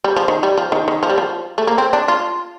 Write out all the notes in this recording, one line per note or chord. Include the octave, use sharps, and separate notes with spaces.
G3
F3
D#3
G3
F3
D#3
D#3
F3
G3
F3
A3
A#3
C4
D4
F4